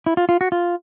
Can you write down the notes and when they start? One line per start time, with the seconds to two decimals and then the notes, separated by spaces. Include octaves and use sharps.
0.06 E4
0.17 F4
0.29 F4
0.41 F#4
0.52 F4